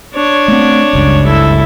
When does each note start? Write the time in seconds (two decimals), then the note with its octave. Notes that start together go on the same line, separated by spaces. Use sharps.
0.14 D4 C#5
0.48 A3 C4
0.93 F#1 C#2 G2
1.26 E4 A4